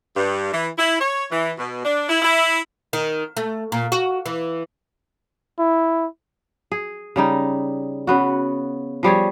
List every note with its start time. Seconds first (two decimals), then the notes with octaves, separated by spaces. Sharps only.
0.15 G2
0.53 E3
0.78 E4
1.00 C#5
1.31 E3
1.58 B2
1.84 D4
2.09 E4
2.22 E4
2.93 D#3
3.37 A3
3.72 A#2
3.92 F#4
4.26 E3
5.59 E4
6.72 G#4
7.16 C#3 G3 D#4
8.07 C#3 B3 F#4
9.03 F3 G3 G#4 C#5